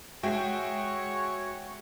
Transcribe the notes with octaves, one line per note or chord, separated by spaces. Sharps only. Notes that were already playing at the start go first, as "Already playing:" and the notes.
G#3 F#4 G#4 C#5 E5 G5 G#5